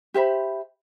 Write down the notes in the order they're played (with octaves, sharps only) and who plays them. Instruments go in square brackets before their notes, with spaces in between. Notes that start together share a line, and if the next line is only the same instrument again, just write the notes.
[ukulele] G4 C5 E5 B5